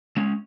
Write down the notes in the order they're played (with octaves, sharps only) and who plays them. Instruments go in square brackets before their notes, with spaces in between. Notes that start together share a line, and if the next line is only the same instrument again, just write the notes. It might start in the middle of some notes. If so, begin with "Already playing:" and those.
[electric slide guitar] G#3 C#4